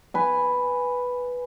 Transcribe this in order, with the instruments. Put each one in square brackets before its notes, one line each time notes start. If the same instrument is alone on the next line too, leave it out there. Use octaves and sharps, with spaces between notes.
[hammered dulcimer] B4 G#5